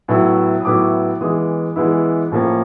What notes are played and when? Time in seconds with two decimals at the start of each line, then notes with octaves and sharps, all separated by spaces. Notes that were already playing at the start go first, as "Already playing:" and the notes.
0.08 A2 F#3 B3 E4
0.61 D#6
0.65 A2 F#3 B3 E4 D6
1.21 E3 G#3 B3 E4 D#6
1.76 E3 G#3 B3 E4
2.31 A2 F3 A#3 C#4